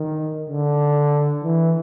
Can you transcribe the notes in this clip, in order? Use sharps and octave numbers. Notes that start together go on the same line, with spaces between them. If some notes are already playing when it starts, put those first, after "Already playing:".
Already playing: D#3
D3
E3